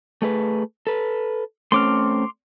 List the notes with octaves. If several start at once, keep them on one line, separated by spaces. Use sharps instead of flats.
A3 G#4 B4
A4 B4
A3 C4 C#4 C6 D6 F6